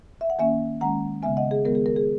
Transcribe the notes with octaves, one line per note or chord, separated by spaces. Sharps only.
E5
F#5
D#3 A#3 C#4 E5 G#5
D#3 G#3 C#4 F#5 A#5
C#3 G#3 B3 E5 G#5
D#5 F#5
G#4
D#3 G#3 B3 A#4
G#4
A#4
G#4